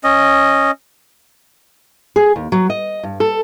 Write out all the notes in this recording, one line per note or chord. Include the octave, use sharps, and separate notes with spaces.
C#4 D#5
G#4
D#2
F#3
D#5
G2
A4